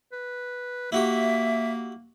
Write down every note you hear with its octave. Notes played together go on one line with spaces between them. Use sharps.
B4
A#3 E4 F#4 G4 E5